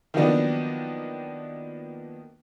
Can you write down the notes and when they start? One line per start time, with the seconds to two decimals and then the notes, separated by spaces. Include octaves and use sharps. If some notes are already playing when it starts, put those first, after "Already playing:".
0.14 D#3 F3 F#3 A#3 B3 D4